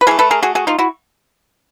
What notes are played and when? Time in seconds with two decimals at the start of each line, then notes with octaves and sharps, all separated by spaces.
0.01 B4
0.07 E3 A3 G#4 A#4
0.19 A4 B4
0.31 G#4 A#4
0.43 F#4 G#4
0.55 F#4 G#4
0.67 D#4 F4
0.79 E4 F#4